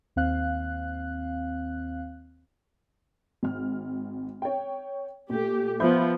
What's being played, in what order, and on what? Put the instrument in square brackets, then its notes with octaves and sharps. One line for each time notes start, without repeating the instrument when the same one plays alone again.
[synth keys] D#2 C4 F5 F#6
[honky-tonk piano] G#1 F6
C#5 G5
[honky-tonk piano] A#2 A3 [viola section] G4
[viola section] F3 B3 [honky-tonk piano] E5 B5 G6